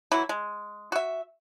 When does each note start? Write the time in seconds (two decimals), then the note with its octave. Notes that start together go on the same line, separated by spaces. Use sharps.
0.12 E3 F#3 E4
0.29 G#3
0.92 F#4 E5